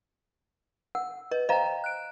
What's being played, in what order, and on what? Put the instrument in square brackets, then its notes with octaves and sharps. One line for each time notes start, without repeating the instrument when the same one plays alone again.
[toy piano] F#5 [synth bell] E6
[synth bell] B4 [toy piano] D#5
[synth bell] C5 G5 [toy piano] D#5 F5 A#5
[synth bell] F#6 D7